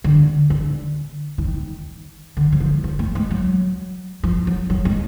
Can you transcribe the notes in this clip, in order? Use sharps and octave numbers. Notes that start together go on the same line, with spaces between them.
D3
D3
E3
D#3
D3
F#3
F3
F3
A3
G#3
F#3
F3
F#3
F#3
G#3